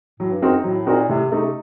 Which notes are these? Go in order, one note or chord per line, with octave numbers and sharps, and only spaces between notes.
A2 F#3
G2
F#2 C4 D#4 F#4 A#4
A2 F#3
A#2 C4 D#4 F#4 A#4
A2 C3
C3 A3 D#4